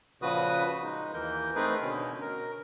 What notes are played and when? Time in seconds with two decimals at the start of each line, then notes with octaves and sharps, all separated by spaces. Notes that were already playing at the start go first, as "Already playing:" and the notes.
0.22 A#2 C#3 F3 F#4 B4 D#6
0.82 G#3 D#4
1.14 D#2 E3 A#4 G6
1.55 A3 C4 D#4 G#4 A#4 B4
1.83 B2 D3 C#4
2.21 A#4